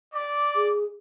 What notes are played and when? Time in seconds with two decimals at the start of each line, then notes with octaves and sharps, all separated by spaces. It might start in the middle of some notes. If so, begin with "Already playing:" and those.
0.14 D5 D6
0.56 G#4